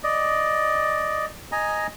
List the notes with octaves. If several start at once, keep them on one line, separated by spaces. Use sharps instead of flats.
D5 D#5
D#5 G#5 A#5